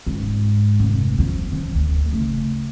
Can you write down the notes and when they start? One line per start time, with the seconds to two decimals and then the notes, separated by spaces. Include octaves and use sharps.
0.07 G#2
0.80 F1
1.18 F3 B3
1.52 E3 F3
1.75 D2
2.13 C#3 A3